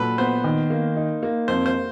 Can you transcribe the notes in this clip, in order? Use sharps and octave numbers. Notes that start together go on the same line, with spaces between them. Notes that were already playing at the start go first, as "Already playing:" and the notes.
Already playing: A#2 F#3 A4 B4
B3 C5
D#3
A#3
D#4
A#3
F2 C5
C5